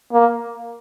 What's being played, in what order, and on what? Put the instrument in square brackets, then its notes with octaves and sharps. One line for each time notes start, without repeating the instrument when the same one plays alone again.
[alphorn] A#3